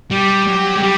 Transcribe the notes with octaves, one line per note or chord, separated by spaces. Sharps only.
G3 G4
F#3
G#3
G3